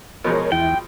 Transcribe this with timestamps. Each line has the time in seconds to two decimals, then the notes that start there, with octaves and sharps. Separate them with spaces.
0.24 B2 F3 G#3 A#4 C#5
0.52 E2 E4 G5